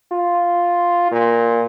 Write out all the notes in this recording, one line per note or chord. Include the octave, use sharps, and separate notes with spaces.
F4
A#2